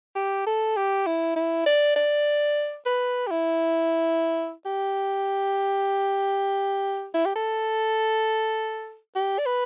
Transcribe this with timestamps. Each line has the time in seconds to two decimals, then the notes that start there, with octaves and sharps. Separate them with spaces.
0.15 G4
0.47 A4
0.77 G4
1.06 E4
1.36 E4
1.67 D5
1.96 D5
2.86 B4
3.27 G4
3.31 E4
4.66 G4
7.14 E4
7.26 G4
7.36 A4
9.16 G4
9.39 D5
9.46 B4